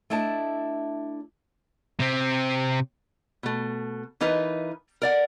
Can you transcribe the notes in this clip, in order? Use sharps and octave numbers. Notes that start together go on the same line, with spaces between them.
A3 D4 E4 D#5 A5
C3 C4
B2 A3
E3 D#4 F4 A#4 B4
A#4 D5 F#5